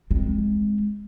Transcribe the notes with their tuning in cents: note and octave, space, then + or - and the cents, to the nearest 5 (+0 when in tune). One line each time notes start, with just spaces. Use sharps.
G#3 +0 C4 +0